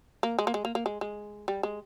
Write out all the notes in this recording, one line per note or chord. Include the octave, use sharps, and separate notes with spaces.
A#3
G#3
A#3
G#3
A#3
A#3
G#3
G#3
G3
G#3